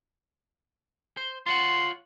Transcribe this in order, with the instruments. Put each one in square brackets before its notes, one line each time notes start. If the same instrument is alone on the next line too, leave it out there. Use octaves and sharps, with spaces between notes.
[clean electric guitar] C5
[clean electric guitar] F4 C#5 F#5 [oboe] C6